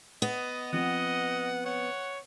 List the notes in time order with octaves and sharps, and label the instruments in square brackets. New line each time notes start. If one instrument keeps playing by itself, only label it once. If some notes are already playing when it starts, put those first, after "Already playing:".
[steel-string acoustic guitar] B3 [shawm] D#5
[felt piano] F3 C4 [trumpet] D#5 [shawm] F#5
[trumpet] C#5 [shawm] F#5